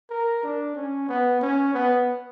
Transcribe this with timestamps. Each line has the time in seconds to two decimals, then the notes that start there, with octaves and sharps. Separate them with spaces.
0.10 A#4
0.44 D4
0.76 C#4
1.09 B3
1.41 C#4
1.74 B3